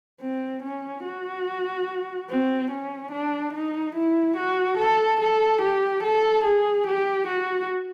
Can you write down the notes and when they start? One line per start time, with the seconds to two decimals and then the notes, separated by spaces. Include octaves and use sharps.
0.21 C4
0.63 C#4
1.05 F#4
2.30 C4
2.71 C#4
3.12 D4
3.54 D#4
3.95 E4
4.37 F#4
4.78 A4
5.20 A4
5.62 G4
6.03 A4
6.45 G#4
6.87 G4
7.28 F#4